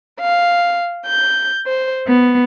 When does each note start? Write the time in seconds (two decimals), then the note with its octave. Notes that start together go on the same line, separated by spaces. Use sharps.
0.20 F5
1.06 G6
1.68 C5
2.07 B3